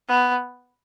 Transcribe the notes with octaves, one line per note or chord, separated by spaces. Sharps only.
B3